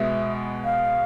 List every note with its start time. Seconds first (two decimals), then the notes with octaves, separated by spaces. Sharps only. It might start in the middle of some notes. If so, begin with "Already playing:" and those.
Already playing: B2 G#3 B3 E5
0.64 F5